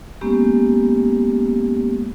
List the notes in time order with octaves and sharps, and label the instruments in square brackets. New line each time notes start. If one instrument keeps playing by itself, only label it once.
[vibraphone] G#3 A#3 B3 C#4 G4